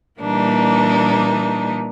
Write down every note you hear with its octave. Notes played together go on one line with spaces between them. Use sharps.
A#2 E3 G3 A#3 D4 D#4